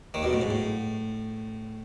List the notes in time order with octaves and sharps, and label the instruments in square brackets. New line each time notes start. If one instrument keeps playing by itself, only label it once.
[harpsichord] D#2 D#3
B1 B2
A2
G#2
A2